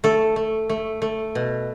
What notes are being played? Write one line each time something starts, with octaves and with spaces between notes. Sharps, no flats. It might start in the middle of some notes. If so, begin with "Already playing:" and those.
A3 A4
A3
A3
A3
B2